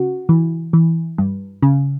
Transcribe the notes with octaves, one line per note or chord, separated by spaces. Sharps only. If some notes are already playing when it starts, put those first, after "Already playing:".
Already playing: C#3 F#4
E3
E3
G2
C#3